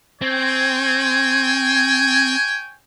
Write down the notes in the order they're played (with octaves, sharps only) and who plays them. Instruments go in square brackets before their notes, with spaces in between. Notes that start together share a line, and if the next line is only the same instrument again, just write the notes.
[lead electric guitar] C4 [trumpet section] C#5 G5 G#5